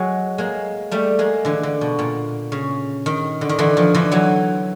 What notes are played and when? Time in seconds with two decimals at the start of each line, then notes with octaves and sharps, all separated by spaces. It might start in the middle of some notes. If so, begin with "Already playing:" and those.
Already playing: F#3 G#3
0.38 G#3 A#3
0.91 G3 A3
1.19 G#3 A#3
1.45 D3 E3
1.63 D3
1.81 B2
1.99 A#2
2.52 C#3
3.06 D#3
3.41 D3
3.49 D#3
3.59 D3 E3
3.77 D#3 F3
3.94 D3 E3
4.12 E3 F#3